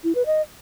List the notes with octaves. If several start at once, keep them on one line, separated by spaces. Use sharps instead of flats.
E4
B4
D#5